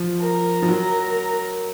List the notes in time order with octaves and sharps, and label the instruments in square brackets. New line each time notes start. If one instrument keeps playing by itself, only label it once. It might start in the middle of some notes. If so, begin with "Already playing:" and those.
Already playing: [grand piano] F3
[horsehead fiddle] A#4
[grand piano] F3
F#3